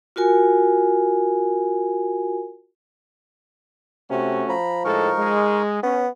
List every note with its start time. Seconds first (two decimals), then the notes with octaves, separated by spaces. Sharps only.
0.16 F4 F#4 A#4 G#5
4.10 C3 A3 C#4 F#4
4.49 F3 A#5 B5
4.85 A2 G#3 D#4 A4 A#4 C#6
5.17 G#3
5.83 B3 C#4